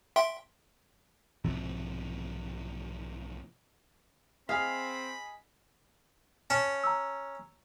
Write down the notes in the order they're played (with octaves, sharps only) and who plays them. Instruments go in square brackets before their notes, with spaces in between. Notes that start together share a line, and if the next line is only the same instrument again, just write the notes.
[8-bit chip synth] E5 G5 C6
[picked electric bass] B1 G#2 C3 F3
[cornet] C4 [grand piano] G#4 D#5 [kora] F5 [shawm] B5
[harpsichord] C#4 A5
[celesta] A#5 E6